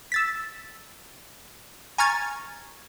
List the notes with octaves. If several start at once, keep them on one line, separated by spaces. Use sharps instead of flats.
E6 A6 B6
G#5 A#5 C#6 F6 G#6 A6